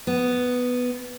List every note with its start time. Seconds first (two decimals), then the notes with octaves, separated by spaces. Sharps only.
0.07 B3